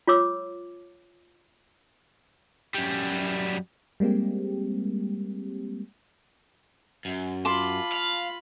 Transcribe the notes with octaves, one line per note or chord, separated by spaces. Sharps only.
F4 C#5 D6 E6
F#2 G3
G3 G#3 A#3 C4 G4
F#2
F4 A5 B5 C6 D6
F5